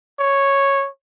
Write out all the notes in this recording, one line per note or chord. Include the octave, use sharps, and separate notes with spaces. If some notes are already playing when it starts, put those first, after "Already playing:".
C#5